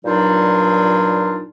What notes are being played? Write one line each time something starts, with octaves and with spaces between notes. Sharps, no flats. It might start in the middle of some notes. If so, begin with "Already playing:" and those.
G2 A#2 F#3 D4 D#4 F4